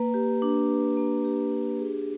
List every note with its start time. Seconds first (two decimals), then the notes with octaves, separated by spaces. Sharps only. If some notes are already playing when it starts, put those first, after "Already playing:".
Already playing: A#3 B4
0.14 G4
0.42 D4
0.69 B4
0.97 A#3
1.25 G4
1.52 D4
1.79 G#4